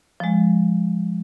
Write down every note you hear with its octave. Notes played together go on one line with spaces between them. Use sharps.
F3 G#3